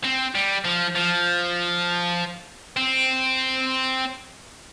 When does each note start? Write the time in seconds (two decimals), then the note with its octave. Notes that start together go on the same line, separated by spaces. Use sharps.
0.04 C4
0.35 G3
0.65 F3
0.95 F3
2.77 C4